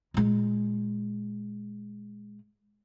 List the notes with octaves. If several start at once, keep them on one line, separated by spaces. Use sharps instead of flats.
A#2 G#3